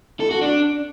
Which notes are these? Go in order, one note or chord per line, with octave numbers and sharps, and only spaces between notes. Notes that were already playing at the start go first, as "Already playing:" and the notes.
A4
F#4
D4